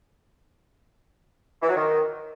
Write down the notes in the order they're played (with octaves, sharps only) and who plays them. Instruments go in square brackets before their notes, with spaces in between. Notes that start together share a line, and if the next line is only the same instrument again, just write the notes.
[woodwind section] E3
F#3
D#3